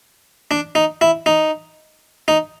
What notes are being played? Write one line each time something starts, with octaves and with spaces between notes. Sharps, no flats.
D4
D#4
E4
D#4
D#4